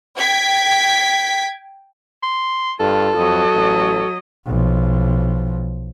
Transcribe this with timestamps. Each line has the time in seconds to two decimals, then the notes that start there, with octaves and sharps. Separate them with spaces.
0.17 G5 G#6 B6
2.23 C6
2.80 G2 F4 A4
3.16 F2 F#3 D#5
3.54 A1
4.46 B1 F3